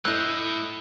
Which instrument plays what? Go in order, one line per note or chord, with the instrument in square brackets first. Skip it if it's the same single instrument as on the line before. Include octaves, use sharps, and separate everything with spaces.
[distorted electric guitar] A2 [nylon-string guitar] A3 E4 [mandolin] D#5 F#6 [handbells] E6 G6